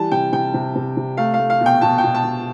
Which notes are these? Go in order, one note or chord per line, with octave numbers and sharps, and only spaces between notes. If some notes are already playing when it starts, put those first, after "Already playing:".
Already playing: E3 G3 A5
C3 G5
C3 G5
C3
C3
C3
A3 F5
F5
A3
F5
B2
G5
B2 A5
G5
B2
A5
B2